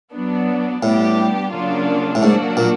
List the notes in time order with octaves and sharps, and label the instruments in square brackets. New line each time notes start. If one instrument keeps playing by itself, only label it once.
[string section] F#3 B3 D4
[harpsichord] A2 [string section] G3 B3 D4 G4
[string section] C#3 F#3 A#3 D4 F4
[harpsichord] A2
[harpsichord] G#2 [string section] F#3 A#3 D4 F#4
[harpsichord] A#2